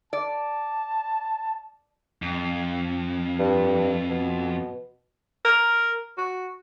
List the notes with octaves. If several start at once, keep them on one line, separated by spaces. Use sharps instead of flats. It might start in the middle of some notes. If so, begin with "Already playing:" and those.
D5 A5
F2
G2
B2
A#4
F#4